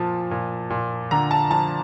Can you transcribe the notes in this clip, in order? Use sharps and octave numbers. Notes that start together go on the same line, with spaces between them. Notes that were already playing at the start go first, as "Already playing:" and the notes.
Already playing: A#2 F3 A5
A#2
A#2
D3 A#5
A5
F3 A5